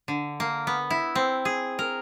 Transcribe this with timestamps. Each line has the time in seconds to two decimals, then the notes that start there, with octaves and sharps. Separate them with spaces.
0.08 D3
0.40 A#3
0.67 B3
0.90 E4
1.15 C4
1.45 G#4
1.79 A#4